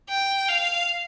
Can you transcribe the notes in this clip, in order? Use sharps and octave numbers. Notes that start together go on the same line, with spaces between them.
G5
F5